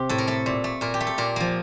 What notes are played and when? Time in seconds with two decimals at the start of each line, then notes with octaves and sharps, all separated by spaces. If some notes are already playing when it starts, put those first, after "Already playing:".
Already playing: C3 G4
0.09 A2 A4
0.18 A#4
0.27 A3 A4
0.46 A#2
0.64 A3
0.81 A#2 A#4
0.94 G4
1.00 A3
1.07 A4
1.18 A#2 A#4
1.36 F3 A#3